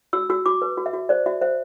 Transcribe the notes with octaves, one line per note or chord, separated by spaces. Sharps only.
F#4 E6
F#4 E6
F#4 D6
B4
F#4
E5
F#4
C5 D5
F#4 E5
C5 E5